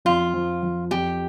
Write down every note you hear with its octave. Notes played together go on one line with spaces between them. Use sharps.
F2 F4
F3
F3
F2 G4